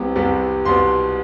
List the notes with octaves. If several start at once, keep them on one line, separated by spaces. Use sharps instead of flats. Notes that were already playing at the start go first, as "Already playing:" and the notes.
Already playing: C2 C3 G3 B3
C2 C3 G3 B3
C2 B2 G3 B3 C6